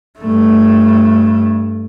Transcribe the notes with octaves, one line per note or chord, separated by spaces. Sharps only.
G2 A3